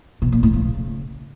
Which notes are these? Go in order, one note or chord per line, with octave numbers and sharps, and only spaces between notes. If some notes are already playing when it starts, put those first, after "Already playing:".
B2
A#2
A2
C#3